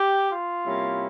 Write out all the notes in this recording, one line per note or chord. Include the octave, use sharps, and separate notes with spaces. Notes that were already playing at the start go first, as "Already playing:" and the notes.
Already playing: G4
F4
C3 G3 A#3 C#4 E4